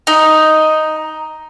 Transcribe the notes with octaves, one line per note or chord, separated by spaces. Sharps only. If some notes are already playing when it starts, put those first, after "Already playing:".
D#4